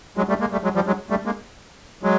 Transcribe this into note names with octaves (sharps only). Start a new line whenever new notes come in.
F#3 G#3
G3 A3
G#3 A#3
G3 A3
F#3 G#3
F3 G3
F#3 G#3
G3 A3
G#3 A#3
F#3 G#3